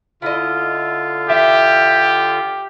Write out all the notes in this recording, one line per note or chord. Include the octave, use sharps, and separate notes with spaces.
D3 E4 F4 D#5
G4 E5